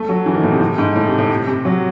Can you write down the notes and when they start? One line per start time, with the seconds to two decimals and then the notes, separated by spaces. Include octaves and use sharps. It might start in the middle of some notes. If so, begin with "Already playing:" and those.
Already playing: A3
0.09 F#3
0.26 E3
0.34 D#3
0.43 A2
0.52 C3
0.60 A2
0.78 G#2
0.96 A2
1.07 C3
1.19 A2
1.30 C3
1.47 C3
1.65 F#3